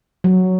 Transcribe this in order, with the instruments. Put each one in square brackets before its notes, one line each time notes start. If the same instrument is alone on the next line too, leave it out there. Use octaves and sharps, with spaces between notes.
[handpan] F#3